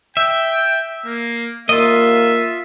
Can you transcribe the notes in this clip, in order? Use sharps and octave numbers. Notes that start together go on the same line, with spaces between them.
E5 G5
A#3
A#3 F4 D#5 E5